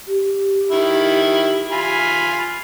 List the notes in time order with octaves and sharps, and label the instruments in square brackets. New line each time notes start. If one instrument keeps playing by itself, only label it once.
[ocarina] G4
[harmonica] D#3 E4
F4 G#5 B5